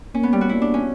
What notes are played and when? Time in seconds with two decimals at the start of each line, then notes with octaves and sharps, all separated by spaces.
0.14 A#3 C#4
0.23 B3
0.33 G3
0.41 F#4
0.49 A#3 E4
0.62 D4
0.74 C#4